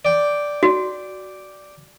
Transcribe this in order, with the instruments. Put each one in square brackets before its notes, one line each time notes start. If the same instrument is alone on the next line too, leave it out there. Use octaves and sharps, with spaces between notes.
[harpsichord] D5 G5
[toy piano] F#4